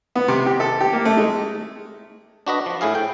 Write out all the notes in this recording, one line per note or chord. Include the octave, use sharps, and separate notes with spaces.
B3
C3
G4
A4
G4
A#3
A3
G#3
D4 F#4 B4 D#5
F3
A2 E4 G#4 F5
G5